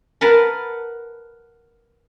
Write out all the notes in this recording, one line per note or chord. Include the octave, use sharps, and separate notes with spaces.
A#4 B4 F#5 A5